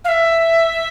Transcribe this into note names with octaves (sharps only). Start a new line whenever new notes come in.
F5
E5